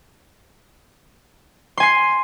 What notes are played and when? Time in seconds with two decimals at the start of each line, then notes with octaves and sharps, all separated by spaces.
1.77 C6
1.80 G#5
1.83 C7